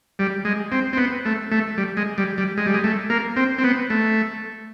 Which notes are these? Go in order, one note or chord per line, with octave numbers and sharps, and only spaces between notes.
G3
G#3
C4
C4
B3
A3
A3
G3
G#3
G3
G3
G#3
G3
G#3
A3
A#3
C4
C4
B3
A3